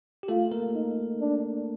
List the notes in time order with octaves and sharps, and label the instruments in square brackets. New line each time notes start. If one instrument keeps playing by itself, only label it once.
[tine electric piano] G4
[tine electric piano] A3 A4 [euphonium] F4
[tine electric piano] A#3 A#4
[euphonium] D#4
D4